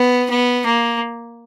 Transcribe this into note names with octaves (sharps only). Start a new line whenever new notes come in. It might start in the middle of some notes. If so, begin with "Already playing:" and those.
Already playing: B3
B3
A#3